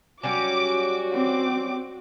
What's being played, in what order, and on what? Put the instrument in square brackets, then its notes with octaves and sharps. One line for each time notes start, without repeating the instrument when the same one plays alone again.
[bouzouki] F#3 G3 C#4 [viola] F#4 [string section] D6
[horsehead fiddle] C4 [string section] D6